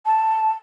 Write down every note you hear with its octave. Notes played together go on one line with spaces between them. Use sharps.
A5